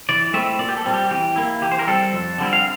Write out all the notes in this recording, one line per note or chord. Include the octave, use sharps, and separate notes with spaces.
E3 D5
A3 C4 E4 E5
A#2 D5
G4
A4
G3 C4
G4
E3 G4
A#3 E4
E3 G4
C5
A#4
G3 C4 A4
F2
D3 G3 C4 E4
F5